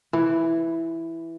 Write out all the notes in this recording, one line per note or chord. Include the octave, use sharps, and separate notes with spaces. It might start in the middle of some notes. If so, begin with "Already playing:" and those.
E3